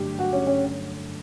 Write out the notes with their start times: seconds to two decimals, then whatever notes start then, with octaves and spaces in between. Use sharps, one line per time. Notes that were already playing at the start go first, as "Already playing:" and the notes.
Already playing: G2 D3 F#3 A3 D4 G4
0.19 F#4
0.33 C#4
0.47 C#4